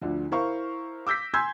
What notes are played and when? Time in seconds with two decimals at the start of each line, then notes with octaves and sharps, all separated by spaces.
0.01 D2 D3 F3
0.31 E4 A#4 C5 F5 C#6
1.07 D6 E6 G6 A#6 B6
1.34 G#5 C6 E6 G6 G#6